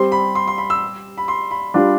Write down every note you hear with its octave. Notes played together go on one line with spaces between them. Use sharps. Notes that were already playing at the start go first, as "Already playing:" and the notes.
Already playing: G3 C4 G4 C6
B5
C6
C6
B5
E6
B5
C6
B5
G3 D4 F4